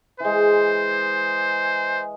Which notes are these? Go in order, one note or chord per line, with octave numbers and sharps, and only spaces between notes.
E3 G#3 C5